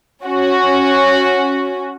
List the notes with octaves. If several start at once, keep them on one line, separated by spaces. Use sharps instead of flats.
C#4 F#4